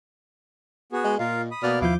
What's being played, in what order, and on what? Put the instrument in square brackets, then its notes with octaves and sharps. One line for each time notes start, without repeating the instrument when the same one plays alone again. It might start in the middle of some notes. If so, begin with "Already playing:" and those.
[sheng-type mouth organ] B3 F#4 G#4
[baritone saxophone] G#3 [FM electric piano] D#5
[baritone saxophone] A#2 [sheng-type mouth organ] F4 A#4 F5
[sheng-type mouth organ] B5 D#6
[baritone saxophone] B2 [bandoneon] A#3 D5 F6
[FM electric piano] D#2 F3 G6 [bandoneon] E4 F5 [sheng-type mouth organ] D6